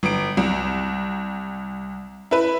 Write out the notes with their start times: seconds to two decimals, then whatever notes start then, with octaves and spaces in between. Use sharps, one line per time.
0.03 G1 D7
0.37 C2
2.31 E4 B4